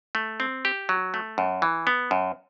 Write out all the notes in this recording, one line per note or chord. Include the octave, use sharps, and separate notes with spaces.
A3
C4
G4
F#3
A3
F#2
E3
B3
F#2